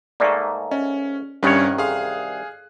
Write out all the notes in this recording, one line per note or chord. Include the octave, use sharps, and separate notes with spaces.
G#2 A3 A#3 D5 G#5 C#6
C#4 D#5
C2 G2 D#3 C#4 C#5 F#6
G#4 A4 F5 C6